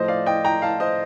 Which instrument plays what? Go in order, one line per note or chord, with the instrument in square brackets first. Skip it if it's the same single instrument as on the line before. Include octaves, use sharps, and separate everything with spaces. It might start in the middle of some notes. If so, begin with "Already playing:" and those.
Already playing: [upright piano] A2 F3 C5 D#5
D5 F5
D#5 G5
G5 A#5
F5 A5
C5 D#5